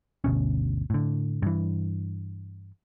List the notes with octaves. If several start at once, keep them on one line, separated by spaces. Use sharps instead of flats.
G1 D2 B2 C#4
A2 D3
G2 E3